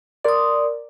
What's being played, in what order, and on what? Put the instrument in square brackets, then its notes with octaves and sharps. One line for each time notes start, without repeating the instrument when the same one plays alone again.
[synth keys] A#4 D5 [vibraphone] C6 D#6